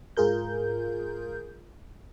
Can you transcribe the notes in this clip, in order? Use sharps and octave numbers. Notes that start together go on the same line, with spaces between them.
G#2 F4 G#4 A#4 G6